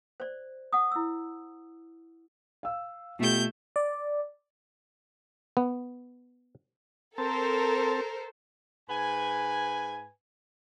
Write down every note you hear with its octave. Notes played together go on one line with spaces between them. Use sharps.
C5 D5
F#5 D#6
E4 E6
F5 E6
B2 A3 F4 G4 G6
D5
B3
C4 A4 A#4 C5 A5
G#2 B4 G#5